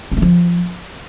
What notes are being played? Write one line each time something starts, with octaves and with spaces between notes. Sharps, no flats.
C#4
A3
F3